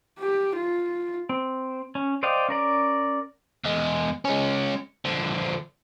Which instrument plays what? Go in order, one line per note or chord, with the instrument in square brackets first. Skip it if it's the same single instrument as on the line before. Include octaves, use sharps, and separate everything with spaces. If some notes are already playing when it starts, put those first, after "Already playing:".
[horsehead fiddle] G4
F4
[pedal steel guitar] C4
C#4
C5 D5 D#5 F5 G5
C#4 A#4 D5
[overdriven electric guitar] E2 G#3
G#3 C#4
D3 F3